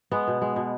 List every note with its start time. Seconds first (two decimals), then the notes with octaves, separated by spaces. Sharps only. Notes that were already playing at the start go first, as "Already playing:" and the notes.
0.11 G#3 B3
0.27 B2
0.42 G#3
0.56 B2